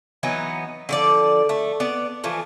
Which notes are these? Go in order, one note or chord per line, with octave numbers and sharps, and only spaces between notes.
E3 F#3 B3 D#4
D3 F3 D5
A3
B3 D5
E3 F3 A3